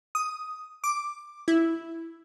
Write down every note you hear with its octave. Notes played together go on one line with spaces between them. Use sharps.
D#6
D6
E4